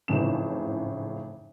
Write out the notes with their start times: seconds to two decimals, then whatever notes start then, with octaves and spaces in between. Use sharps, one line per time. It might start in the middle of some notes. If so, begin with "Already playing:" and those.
0.08 G#1 F2 A2 C#3 E3 E7